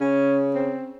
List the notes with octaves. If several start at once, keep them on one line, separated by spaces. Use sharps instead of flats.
C#3 C#4
C4